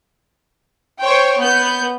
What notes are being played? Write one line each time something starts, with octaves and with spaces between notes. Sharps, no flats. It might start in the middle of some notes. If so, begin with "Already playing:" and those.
C5 C#5 G5
B3 G6